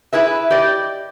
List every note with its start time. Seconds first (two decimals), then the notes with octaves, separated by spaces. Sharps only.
0.13 E4 G#4 B4 E5
0.50 G4 D5 D#5